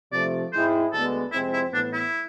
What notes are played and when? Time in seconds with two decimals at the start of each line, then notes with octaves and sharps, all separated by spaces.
0.12 C3 F3 A3 D5
0.52 G#2 G#3 C4 E4 C5
0.93 D2 D3 G#3 B3 A4
1.32 F2 C3 G#3 C4 E4
1.53 E4
1.72 A2 E3 B3 D4
1.93 E4